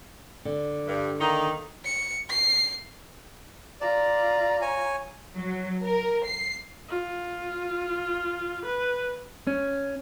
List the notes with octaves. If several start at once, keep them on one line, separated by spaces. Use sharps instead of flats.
D3
G2
D#3 A#3 D#4
C#7
C7
F4 D5 A#5
C#5 G#5
F#3
A#4
C7
F4
B4
C#4